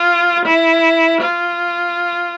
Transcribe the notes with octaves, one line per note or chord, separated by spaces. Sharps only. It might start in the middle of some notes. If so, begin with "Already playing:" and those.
Already playing: F4
E4
F4